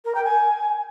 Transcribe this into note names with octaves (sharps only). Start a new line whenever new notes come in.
A#4
G5
G#5